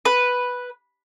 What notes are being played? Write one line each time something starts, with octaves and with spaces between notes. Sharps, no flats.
B4